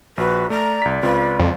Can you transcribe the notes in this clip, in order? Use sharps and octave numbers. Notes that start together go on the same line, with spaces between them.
A#1 F#4 B4
A3 D5 A#5
C2 B6
C#2 C4 F4 B4
F2